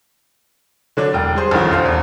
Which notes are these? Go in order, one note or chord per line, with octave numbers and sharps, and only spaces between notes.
D3 F#3 D4
E1 G5
G3 G#4 C5
A1 D2 D#3 F3
F1 A#1 C5 F5
D#1 E2